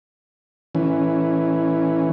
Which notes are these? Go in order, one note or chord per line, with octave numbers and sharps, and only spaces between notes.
E3 C#4